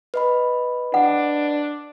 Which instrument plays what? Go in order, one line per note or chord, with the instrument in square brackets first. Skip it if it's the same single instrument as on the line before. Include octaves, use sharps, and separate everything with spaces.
[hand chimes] B4 D#5 B5
[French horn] D4 [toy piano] F#5